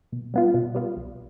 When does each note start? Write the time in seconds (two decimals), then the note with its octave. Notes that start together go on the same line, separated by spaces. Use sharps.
0.12 B2
0.34 G3 B3 F4
0.54 B2
0.75 G3 B3 F4
0.97 B1